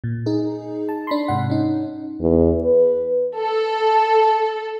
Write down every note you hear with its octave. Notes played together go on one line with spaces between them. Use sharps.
A#2
D#4 G#4
A5
D4 B5 C6
G#2 C3 F#5
C#4 D#4
E2
B4
A4